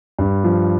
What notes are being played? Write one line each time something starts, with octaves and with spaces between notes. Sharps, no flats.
G2
F3